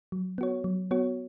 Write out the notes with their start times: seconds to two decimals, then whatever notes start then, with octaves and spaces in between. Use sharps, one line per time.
0.12 F#3
0.38 B3 F#4 C#5
0.64 F#3
0.91 B3 F#4 C#5